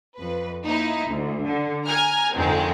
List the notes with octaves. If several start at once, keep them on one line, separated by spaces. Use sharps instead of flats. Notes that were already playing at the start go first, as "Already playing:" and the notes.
F2 B4
A#3 D#4 E4
D2
D3
G#5 A#5 F6
F2 D3 D#3 G#3 C4